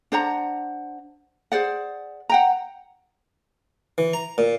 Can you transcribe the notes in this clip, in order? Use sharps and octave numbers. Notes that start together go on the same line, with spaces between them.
D4 C5 F#5 A#5
G#4 C5 D5 F#5
F#5 G5 A#5
E3
A#5
A#2